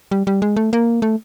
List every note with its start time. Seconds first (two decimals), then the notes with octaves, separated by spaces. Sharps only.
0.11 G3
0.27 G3
0.42 G#3
0.56 A3
0.73 A#3
1.02 A3